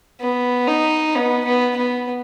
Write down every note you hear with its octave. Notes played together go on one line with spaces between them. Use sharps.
B3
D#4
B3
B3
B3